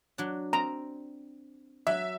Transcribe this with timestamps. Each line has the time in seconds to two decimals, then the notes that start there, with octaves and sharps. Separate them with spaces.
0.18 F#3 D4
0.53 C4 A#5
1.87 F#3 E5